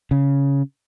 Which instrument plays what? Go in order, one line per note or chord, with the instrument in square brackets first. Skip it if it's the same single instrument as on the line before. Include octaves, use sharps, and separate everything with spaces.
[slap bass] C#3